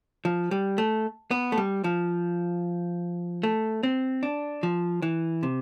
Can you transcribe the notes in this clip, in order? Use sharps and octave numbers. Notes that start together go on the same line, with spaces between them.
F3
G3
A3
B3
A3
G3
F3
A3
C4
D4
F3
E3
C3